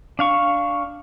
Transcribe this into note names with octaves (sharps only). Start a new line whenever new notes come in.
D4 F5 C#6